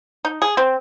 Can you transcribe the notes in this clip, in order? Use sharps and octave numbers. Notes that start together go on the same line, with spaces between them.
D#4
G#4
C4